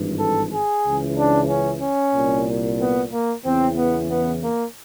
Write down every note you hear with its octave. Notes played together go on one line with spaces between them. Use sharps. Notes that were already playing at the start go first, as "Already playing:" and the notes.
Already playing: G#1 G2 E3
A4
G#4
C#2 C#3 E3
D4
C#4
C#4
C2 A#2
B3
A#3
E2 C#3 E3 C4
B3
B3
A#3